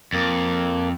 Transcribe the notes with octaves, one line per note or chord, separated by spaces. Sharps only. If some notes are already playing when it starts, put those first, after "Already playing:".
F2 A#3